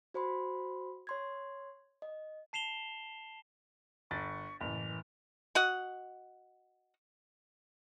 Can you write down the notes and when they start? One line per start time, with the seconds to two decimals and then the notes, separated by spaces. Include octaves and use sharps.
0.14 F#4 C5 B5 C6
1.07 C#5 C6 G#6
2.02 D#5
2.53 A5 C7 E7 F7 G7
4.11 G1 C#6 A6
4.60 F#1 A2 E3 F7
5.55 F#4 D#5 F#5